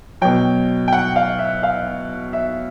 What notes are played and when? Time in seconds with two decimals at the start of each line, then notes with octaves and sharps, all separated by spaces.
0.21 B2 F#3 G5
0.88 G5
0.92 F#5
1.16 F5
1.39 E5
1.63 F5
2.33 E5